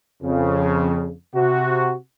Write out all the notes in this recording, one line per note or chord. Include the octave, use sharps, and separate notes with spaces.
F2 C#3
C3 F#4